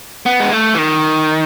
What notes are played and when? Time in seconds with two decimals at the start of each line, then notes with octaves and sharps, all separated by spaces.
0.26 B3
0.40 G#3
0.53 A3
0.75 E3
0.78 D#3